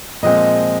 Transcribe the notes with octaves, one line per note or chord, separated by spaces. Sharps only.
A#2 F3 G#3 C4 D#5